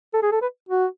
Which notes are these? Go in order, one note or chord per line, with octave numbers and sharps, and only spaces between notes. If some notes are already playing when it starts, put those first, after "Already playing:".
A4
G#4
A4
B4
F#4